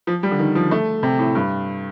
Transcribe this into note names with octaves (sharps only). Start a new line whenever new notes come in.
F3
G3
D3
D#3
F3
A3
C3
A2
G2